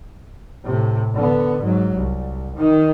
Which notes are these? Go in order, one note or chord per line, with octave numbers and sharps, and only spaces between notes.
A2 C3
D3 B3
G#2 F#3
C2
D#3 D#4